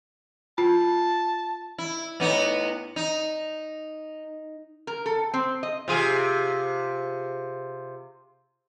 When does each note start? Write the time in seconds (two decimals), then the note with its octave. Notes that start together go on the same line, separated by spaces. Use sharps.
0.58 F4 A5
1.78 E4
2.20 A2 B3 D#4
2.96 D#4
4.87 A#4
5.06 A4
5.34 C4
5.63 D#5
5.88 C3 F4 G#4